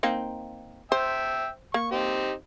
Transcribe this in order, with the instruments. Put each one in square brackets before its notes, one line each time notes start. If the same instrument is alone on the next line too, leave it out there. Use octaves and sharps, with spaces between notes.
[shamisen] A#3 C4 D#4
[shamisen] C5 [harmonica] E5 G5
[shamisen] A#3 [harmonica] C#6
[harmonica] C4 D#4 G4